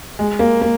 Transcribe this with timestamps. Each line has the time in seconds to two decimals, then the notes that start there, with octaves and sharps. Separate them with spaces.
0.19 G#3
0.39 A#3
0.61 A#3